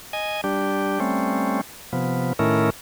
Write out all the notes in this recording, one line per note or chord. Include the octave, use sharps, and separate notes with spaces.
D#5 G#5
G3 D4 G4
G3 A3 C4 C#4
C3 F3 B3
A2 D#3 A3 C#4 E4 A#4